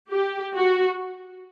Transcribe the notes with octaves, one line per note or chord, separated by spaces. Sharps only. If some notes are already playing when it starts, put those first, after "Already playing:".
G4
F#4